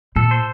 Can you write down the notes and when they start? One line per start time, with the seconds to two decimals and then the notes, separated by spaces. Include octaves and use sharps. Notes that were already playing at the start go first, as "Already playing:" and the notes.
0.16 A#2 A4
0.31 C5